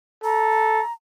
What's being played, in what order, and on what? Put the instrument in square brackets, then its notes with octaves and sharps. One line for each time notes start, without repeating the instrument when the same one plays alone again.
[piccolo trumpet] A4 [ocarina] A#5